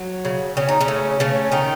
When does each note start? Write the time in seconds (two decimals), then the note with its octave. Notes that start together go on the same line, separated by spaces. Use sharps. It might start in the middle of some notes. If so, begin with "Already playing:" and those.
Already playing: F#3
0.25 C#3
0.57 C#3 C#4
0.69 D#4
0.81 C#3 C#4
0.88 A3
1.20 C#3 A3 C#4
1.51 D#3 A3 D#4